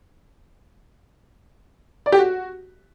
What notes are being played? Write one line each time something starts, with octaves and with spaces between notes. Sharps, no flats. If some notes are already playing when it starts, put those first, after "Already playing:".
D5
G4
F#4